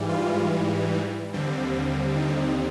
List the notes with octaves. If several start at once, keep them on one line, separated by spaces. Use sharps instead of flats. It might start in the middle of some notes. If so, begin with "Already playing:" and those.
Already playing: G#2 E3 G3
F4
D#2 D3 G3 C4
D#4